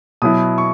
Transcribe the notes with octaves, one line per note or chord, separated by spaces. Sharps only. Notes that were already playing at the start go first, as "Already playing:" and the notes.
B2 F#3 B3 E4 D#6
C#6